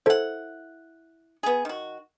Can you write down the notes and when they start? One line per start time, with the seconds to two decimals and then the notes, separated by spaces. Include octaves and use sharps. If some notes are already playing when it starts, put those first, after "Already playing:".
0.06 E4 A4 C5 F#5
1.43 B3 G#4
1.65 D#3 F#4